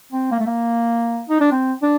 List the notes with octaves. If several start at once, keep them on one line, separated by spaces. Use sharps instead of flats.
C4
A#3
A3
A#3
D#4
D4
C4
D4